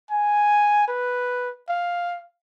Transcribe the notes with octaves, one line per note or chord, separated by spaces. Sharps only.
G#5
B4
F5